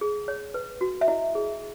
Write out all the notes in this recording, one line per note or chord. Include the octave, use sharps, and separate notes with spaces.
G#4
C#5
B4
F#4
E5
E4 D#5
G#4